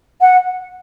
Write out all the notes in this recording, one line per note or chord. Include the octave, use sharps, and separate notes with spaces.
F#5